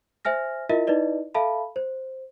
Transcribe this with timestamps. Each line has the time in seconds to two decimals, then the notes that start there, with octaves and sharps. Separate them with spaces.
0.25 C5 E5 G#5 F6 A#6
0.69 E4 F4 A#4 D#5 E5
0.87 D#4 E4 B4 D5 D#5
1.35 A4 E5 F5 A5 B5
1.76 C5